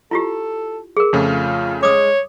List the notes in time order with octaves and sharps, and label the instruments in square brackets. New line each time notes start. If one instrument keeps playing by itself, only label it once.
[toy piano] E4 F4 G4 [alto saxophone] A4
[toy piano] G#4 A#4
[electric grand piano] F2 C#3 A3 [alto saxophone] F4
[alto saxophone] G#3 [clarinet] C#5 [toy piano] D6 D#6